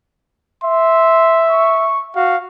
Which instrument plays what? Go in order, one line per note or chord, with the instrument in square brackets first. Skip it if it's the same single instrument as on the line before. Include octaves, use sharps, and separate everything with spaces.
[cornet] E5 [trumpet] C6
[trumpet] C#6
[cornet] F#4 [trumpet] F5